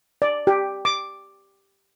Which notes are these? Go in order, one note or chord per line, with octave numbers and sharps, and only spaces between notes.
D5
G4
D6